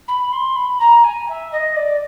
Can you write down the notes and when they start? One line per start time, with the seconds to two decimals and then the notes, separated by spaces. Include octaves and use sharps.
0.08 B5
0.32 C6
0.56 B5
0.80 A#5
1.03 G#5
1.29 E5
1.52 D#5
1.76 D5